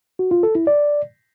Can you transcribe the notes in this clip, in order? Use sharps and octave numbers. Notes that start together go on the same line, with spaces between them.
F#4
F4
A4
E4
D5